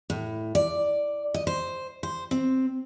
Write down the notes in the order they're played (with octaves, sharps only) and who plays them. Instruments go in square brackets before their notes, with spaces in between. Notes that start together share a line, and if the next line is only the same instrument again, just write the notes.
[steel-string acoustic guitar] A2
D5
D#5
C5
C5
C4